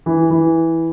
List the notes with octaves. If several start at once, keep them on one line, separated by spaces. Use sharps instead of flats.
E3
E3